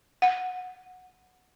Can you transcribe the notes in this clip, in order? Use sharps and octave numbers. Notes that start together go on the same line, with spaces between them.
F#5